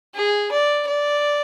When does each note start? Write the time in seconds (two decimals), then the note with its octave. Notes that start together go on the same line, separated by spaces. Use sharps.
0.15 G#4
0.52 D5
0.87 D5